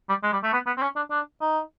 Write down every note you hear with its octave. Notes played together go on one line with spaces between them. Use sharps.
G3
G#3
G3
A3
B3
B3
C4
C#4
D4
D4
D#4